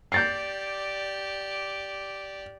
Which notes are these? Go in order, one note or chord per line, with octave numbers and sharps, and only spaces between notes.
G4 D5 G6 A6 C7